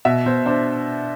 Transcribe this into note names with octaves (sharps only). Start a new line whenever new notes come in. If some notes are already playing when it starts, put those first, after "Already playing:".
B2 E5
B2 C5
D4 C5